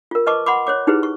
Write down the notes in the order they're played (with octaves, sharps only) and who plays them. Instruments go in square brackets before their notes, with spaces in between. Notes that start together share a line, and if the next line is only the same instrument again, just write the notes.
[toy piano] F4 A#4
B4 D#5 A5 C#6 D6
F#5 B5 C6 D6
C5 C#5 D6
D#4 E4 G4 G#4 B4 C5
C#6